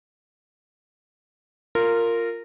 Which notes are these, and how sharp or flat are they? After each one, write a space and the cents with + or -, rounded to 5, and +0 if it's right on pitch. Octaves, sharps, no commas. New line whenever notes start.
F4 +0 A#4 -15